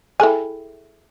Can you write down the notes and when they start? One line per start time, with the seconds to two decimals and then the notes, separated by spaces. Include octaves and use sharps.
0.20 E4 G#4 A4 G5 G#5